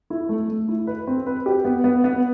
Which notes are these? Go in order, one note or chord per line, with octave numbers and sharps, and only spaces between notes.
E4
A3
A3
E4
B4
C4
B4
G4
B3
B3
B3